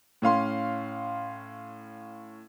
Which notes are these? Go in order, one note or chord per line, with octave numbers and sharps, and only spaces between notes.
A2 C#4 F5 C6